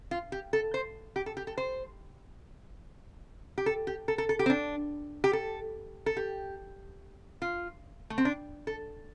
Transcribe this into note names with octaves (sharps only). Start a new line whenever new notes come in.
F4
G4
A4
C5
G4
A4
G4
A4
C5
G4
A4
G4
A4
A4
A4
G4
C4
D4
G4
A4
A4
G4
F4
A3
C4
D4
A4